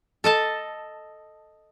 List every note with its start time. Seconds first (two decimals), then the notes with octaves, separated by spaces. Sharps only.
0.24 A4 D#5 A5